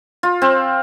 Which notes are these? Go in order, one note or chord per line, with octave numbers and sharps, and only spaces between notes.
F4
C4